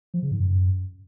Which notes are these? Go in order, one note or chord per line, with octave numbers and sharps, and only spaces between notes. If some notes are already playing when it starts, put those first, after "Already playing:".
F3
C#3
G#2
F#2